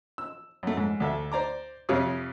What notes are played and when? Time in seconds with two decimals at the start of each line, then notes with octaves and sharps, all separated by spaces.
0.18 E6
0.63 F#2 A3
0.77 G#2
1.00 D2 A4 E5
1.32 C5 D5 A#5 D6
1.89 F2 C3 G3 C#5 F5 D#6